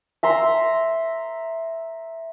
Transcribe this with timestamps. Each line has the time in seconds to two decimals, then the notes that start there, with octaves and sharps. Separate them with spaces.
0.23 E5 A#5 C6